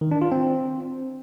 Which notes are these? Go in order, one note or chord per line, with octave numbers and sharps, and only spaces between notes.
D#3
D4
F4
C4